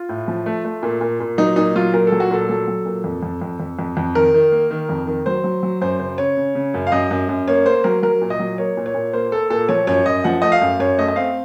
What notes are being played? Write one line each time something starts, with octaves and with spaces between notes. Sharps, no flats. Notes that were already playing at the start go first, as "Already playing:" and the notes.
Already playing: F4
A2
F3
A3
A3
A#2
A#2
A#2
F#3 D#4
A#2 D#4
F#3 F4
A#2 A#4
A4
F#3
F#4
A#2 A4
F#3 A4
F#3
A#2
F2
F2
F2
F2
F2
F2
D#3 A#4
D#3
A#3
D#3
F2
D#3
F#3 C5
F#3
F#3
F#2 C5
C#3 C5
C#3 C#5
C#3
C#3
F#2
F5
F#2 D#5
F#2
F#2
A#3 C#5
A#3 C5
F#3 A#4
F#3 A#4
A#2
D#5
F#3
A#3 C#5
A#2
C#5
A#2
A#3 C5
A#3 A4
A#2 A4
F3 C#5
F#2 C#5
F#2 D#5
F3 F#5
A3 D#5
F5
F#2
F#2 C#5
A3 D#5
D#5
C4 F5